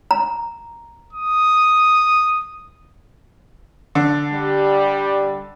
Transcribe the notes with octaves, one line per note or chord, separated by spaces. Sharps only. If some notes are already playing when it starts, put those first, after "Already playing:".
A#5
D#6
D3
G3